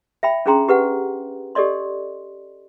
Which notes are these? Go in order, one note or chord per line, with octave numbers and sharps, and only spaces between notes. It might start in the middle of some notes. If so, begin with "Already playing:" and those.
E5 G5 B5
C#4 D4 G#4 G5 A#5 C6
G4 B4 F#5
G4 A4 D5 D#5 C6